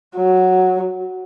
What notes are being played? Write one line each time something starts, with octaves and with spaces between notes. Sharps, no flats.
F#3